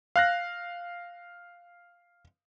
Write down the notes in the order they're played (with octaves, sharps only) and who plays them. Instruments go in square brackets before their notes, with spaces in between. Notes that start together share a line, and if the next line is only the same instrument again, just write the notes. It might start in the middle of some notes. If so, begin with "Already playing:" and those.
[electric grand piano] F5 F#6 A#6